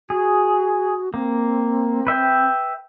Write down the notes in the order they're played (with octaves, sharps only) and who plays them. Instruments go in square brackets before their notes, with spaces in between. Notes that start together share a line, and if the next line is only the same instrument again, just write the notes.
[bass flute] F#4 [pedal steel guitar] G#4
[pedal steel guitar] A#3 [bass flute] C4
[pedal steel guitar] B4 E5 G5